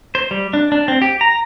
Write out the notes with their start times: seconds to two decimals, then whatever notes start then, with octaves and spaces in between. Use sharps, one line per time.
0.15 C5
0.31 G3
0.53 D4
0.72 D4
0.88 C4
1.02 G4
1.21 A#5